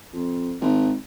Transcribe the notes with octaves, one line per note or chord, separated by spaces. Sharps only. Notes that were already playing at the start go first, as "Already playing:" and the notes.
F2
G#1